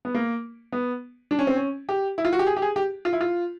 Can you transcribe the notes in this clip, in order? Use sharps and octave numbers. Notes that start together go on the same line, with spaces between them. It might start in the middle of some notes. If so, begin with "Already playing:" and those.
B3
A#3
B3
D4
C#4
C4
C#4
G4
E4
F4
F#4
G4
G#4
G4
G#4
G4
F4
E4
F4